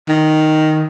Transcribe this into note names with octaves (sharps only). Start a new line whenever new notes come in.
D#3